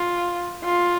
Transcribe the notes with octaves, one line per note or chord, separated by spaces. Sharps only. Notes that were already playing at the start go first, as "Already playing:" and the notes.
Already playing: F4
F4